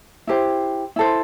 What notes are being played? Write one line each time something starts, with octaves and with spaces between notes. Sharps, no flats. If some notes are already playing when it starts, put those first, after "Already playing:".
E4 G4 C5
E4 A4 C5